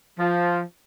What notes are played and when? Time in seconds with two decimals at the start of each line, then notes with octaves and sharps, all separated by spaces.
0.19 F3